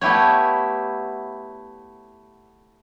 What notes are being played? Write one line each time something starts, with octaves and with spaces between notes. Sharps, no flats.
A3 B3 E4 G4 C#5